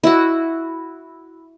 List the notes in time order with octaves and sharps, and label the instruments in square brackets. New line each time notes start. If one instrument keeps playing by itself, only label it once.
[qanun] E4 F#4